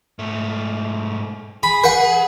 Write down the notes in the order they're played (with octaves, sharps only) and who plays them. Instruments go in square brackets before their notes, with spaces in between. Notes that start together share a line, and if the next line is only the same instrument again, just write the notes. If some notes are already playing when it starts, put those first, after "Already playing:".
[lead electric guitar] G#2 A3
[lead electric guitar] G#4 [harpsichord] B5
[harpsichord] B4 F#5